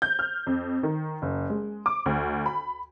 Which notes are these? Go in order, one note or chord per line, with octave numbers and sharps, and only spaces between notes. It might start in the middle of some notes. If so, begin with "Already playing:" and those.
G6
F6
F2
D#3
F#1
G#3
D6
D2
B5